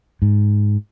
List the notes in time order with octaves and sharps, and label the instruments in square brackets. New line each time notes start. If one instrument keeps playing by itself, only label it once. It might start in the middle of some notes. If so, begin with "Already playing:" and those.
[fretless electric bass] G#2